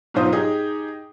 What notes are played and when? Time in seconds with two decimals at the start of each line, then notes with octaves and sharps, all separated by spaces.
0.14 G#2 B2 F#3 F4 C5 D#6
0.32 D#4 G4 G#4